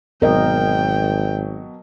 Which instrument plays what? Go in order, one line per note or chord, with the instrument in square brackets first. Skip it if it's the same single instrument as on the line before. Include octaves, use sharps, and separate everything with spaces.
[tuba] G#1 [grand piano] B2 F#3 [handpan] A#4 D#5 [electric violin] G5